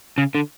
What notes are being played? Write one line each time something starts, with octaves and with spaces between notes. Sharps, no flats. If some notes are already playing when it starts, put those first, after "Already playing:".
C#3
D3